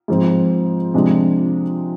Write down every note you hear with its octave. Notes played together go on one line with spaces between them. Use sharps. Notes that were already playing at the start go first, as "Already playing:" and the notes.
G#2 F3 C4
C3 F3 G#3 D4